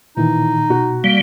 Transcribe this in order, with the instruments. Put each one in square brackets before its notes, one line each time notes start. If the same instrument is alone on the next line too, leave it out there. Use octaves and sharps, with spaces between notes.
[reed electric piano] A#2 D#3 [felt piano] E3 [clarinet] D#4
[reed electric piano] B2 [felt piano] F#4
[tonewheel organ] G3 [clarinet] A#3